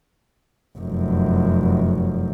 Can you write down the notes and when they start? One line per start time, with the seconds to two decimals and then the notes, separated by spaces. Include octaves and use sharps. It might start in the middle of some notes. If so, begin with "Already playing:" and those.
0.78 F1 F#2